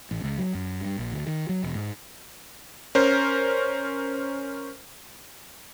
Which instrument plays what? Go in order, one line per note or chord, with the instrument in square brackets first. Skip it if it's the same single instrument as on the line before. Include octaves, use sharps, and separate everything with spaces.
[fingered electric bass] A1
C#2
F#3
F#2
G2
A#1
D2
D#3
F#3
E1
G#2
[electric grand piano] C#4 A#4 C5